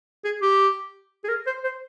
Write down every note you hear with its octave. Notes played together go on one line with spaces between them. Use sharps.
G#4
G4
G#4
A#4
C5
C5